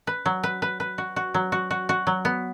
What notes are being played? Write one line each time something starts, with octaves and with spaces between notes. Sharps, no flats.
B4
F#3
B4
B4
B4
F#4
F#4
F#3
F#4
F#4
F#4
F#3
B3